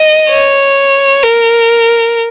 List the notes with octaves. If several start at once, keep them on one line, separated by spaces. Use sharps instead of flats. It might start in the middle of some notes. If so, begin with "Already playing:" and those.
Already playing: D#5
C#5
A#4